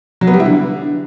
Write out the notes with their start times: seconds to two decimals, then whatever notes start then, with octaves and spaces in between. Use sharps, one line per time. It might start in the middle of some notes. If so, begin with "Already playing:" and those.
0.21 F#3
0.27 B3
0.34 G3
0.40 E4
0.46 D3